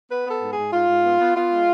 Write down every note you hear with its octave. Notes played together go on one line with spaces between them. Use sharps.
B3 B4
B3 A4
G#2
G#4
G#2
G#2 F4
G#2
B3
B3
B3 F4
G#3